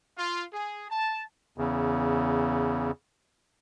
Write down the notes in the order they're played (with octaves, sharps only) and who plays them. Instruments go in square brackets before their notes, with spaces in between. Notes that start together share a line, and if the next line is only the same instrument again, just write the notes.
[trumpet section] F4
G#4
A5
[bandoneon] E2 C#3